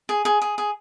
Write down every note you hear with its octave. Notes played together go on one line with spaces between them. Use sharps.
G#4
G#4
G#4
G#4